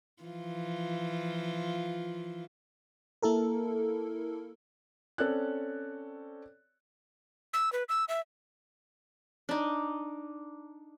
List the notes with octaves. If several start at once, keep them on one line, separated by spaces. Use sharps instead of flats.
E3 F3 F4
A#3 E4 A4 A#4
C4 C#4 A4 C#5 D5 F#6
E6
B4
E6
E5
D4 D#4